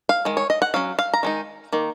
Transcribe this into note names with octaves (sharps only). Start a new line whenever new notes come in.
F5
D#3 G#3
C#5
D#5
F#5
F#3 C#4 F5
F5
A#5
D#3 G#3 D#4
D#3 A#3